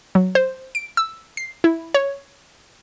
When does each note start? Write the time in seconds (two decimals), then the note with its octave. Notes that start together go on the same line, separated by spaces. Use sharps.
0.15 F#3
0.35 C5
0.75 D7
0.97 E6
1.37 C7
1.64 E4
1.94 C#5